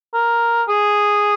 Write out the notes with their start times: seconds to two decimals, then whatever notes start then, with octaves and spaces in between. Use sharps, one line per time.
0.14 A#4
0.68 G#4